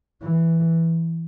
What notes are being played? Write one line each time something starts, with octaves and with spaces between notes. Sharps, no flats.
E3